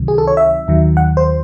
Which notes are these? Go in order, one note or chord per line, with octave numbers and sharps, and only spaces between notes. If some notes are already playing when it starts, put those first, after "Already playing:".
Already playing: C#2 C3 D#3 F#3
G#4
A4
C#5
E5
D#2 D#3 F#3
F#5
C5